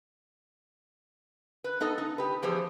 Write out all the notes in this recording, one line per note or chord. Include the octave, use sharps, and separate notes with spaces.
B4
B3 D#4 A4 D#5
D#4
G4 B4
E2 F3 G4 G#4 C5